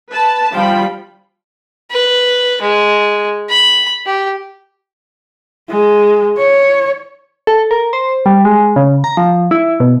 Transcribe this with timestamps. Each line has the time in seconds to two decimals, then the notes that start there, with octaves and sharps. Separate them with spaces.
0.12 B4 A5
0.54 F3 G3 F4 G5 B5
1.91 B4
2.61 G#3
3.50 B5
4.06 G4
5.70 G#3
6.39 C#5
7.47 A4
7.71 A#4
7.93 C5
8.26 G3
8.45 G#3
8.76 C#3
9.04 A#5
9.17 F3
9.51 E4
9.80 B2